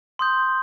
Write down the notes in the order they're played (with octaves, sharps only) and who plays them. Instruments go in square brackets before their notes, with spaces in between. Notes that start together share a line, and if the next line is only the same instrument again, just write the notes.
[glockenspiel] C6 D#6 G6